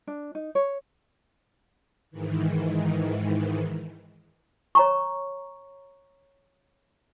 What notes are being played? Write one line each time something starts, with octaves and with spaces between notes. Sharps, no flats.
D4
D#4
C#5
G#2 D#3 E3
C#5 A#5 C#6